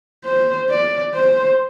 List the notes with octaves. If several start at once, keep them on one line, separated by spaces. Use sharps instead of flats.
C5
D5
C5